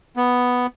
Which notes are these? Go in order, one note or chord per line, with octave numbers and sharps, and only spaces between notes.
B3